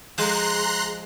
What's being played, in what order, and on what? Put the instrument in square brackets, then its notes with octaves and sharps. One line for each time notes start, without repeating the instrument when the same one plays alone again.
[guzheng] F3 G#3 [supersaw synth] A#5 C6 F#6